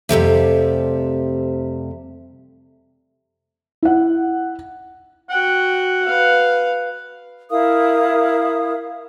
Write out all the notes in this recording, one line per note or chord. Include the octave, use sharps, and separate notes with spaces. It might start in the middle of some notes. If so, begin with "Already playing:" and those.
F2 C3 G3 A3
E4 F#5
F#4 F#5 G5
B4 F5
E4 A#4 F5 D#6